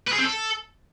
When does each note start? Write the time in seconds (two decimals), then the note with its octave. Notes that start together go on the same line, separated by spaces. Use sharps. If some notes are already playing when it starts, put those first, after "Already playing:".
0.08 B4
0.13 G#4
0.19 C4
0.24 A4